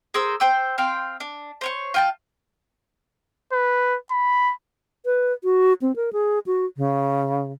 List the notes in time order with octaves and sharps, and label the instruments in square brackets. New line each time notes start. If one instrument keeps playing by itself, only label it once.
[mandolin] G#4 A#4 C5 E6
C5 G5 E6
C4 F5 G5 C6
D4
C5 C#5 C#6
F4 G5 A5
[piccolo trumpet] B4
B5
[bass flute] B4
F#4
C4
A#4
G#4
F#4
C#3